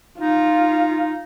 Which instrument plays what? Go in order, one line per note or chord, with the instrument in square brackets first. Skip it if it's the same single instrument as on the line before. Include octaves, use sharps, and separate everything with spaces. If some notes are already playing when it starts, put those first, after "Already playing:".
[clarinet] D#4 [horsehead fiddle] F4